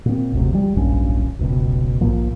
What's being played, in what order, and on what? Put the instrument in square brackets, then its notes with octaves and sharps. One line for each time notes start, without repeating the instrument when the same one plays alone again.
[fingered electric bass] A#2 C4
F#1 D2 C3
F3 G3
D1 A#1 G2 C#4
F1 C#2 B2
A#1 G#2 F3 A#3